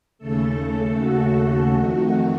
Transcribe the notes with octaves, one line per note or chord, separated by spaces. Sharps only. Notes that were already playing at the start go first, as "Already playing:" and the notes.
D#2 C#3 A3 A4
F#4
F2 D#3 A3 F#4